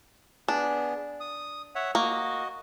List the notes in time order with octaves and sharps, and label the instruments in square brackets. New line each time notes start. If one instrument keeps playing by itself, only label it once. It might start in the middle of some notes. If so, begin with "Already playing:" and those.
[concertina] B3 G#4 [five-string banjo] D4
[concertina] D#6
C#5 E5 F#5
[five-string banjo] A#3 [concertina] F#4 D#5